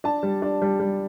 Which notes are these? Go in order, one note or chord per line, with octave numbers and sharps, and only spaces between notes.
D4 A5
G3
D4
G3
G3